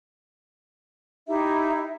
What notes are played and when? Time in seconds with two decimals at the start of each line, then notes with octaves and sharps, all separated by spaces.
1.28 D#4 E4 G4 E5